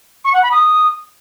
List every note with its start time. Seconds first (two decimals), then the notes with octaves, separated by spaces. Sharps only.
0.24 C#6
0.33 F#5
0.42 B5
0.51 D#6